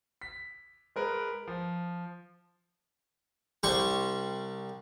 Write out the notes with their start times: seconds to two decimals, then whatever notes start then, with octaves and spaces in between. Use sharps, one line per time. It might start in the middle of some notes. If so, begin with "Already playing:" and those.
0.21 B6
0.96 G#3 A#4 B4
1.47 F3
3.63 C2 G3 G4 C5 C6 C#6